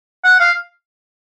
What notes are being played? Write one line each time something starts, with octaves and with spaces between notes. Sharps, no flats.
F#5
F5